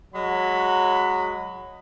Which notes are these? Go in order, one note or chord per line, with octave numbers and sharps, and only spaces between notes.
F#3 G#3 B5